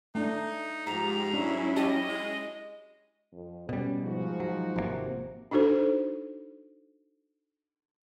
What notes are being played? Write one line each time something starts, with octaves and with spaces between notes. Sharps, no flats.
A3 D4 D#4
G#2 F3 G#3 G4 A#5
F#3 C#4 D4 E4
G4 D#5 A5
G#3
F2
B2 G3 C#4
G#2 F3 F#4
F#3
G#1 C3 D#3 A#3
D4 D#4 F#4 A4 C5